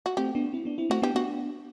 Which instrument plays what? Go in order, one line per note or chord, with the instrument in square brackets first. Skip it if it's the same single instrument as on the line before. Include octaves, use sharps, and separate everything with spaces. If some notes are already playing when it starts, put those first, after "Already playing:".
[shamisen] F#4
[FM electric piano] A3 C4 [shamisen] G4
[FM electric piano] B3 D4
C4 E4
B3 D4
C4 E4
[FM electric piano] A3 C4 [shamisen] F#4
[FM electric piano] B3 D4 [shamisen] G4
[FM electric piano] B3 D4 [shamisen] F#4